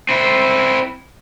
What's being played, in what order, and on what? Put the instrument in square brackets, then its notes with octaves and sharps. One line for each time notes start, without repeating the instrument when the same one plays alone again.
[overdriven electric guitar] C4 E4